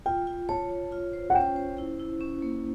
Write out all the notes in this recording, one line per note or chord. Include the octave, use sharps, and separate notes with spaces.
F4 G5
F4
C#5 A5
C#5
F4
C5
F#5
C#4 G5
C5
E4
E4
C#4
A#3